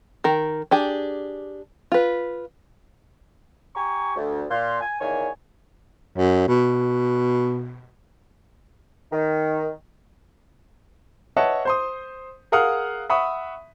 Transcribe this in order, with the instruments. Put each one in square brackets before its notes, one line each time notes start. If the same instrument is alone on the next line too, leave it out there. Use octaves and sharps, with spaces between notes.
[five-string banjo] D#3 A#4
D4 G4 G#4
F4 B4
[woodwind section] G4 G#5 A#5 C#6
D2
A#2 F5 C6
G#5
E2 D#3 A#3 C#5 G#5
[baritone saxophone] F#2
B2
[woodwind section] D#3
[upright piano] B4 C#5 D#5 E5 F#5 A5
C5 C6 D#6
G#4 A#4 F5 F#5 D#6 F6
E5 F#5 B5 C#6 D#6